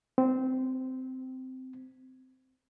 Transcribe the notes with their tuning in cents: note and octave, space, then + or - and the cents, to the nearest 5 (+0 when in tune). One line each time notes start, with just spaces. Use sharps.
C4 -15